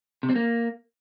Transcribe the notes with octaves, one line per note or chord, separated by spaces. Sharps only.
C3
C4
A#3